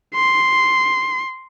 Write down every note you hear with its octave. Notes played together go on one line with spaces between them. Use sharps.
C6